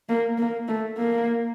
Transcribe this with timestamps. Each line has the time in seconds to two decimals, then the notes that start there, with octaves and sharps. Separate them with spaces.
0.09 A#3
0.38 A#3
0.68 A3
0.98 A#3